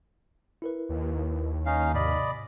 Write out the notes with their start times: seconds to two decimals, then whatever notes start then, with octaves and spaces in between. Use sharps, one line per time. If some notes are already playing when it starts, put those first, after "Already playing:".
0.62 E4 A#4 B4
0.89 D#2
1.66 C#4 D#4 F5
1.95 G#2 C3 D5 D#5 B5